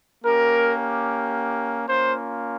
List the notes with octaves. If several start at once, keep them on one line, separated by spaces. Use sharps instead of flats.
A#3 C#4 G4 A#4
A#3 C#4 F4 C5